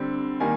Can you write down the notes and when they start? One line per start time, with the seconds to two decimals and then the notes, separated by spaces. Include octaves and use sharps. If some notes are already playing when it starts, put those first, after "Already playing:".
Already playing: D3 G3 C4
0.40 D#3 G3 A#3 G#5